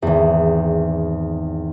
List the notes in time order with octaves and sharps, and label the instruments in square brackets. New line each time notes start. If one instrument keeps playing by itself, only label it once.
[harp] G#1 E2